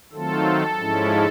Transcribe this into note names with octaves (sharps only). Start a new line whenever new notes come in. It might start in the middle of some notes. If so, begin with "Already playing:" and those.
D#3 F#3 A3 C4 F4 A4
G#2 F3 G#3 C#4 E4